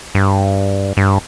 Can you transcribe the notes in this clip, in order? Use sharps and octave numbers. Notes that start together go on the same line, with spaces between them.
G2
G2